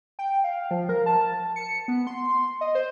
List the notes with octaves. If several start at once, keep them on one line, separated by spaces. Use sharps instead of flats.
G5
F5
F3
A#4
A5
C#7
B3
C6
D#5
C5